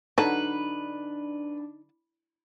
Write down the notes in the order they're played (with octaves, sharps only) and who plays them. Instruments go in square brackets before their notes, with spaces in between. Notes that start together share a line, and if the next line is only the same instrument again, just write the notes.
[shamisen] D3 F#3 A5 [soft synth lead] D4 [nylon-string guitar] D#4 [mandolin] B4